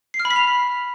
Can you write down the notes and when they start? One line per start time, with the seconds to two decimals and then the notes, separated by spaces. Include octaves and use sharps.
0.14 C7
0.20 F6
0.25 B5
0.30 B6
0.36 F7